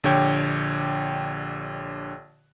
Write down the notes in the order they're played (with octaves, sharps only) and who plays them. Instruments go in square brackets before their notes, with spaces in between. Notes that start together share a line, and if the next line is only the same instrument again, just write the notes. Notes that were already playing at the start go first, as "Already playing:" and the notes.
[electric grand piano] A#1 D3 G4 C#5 G5